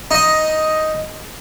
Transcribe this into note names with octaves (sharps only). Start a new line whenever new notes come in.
D#4 D#5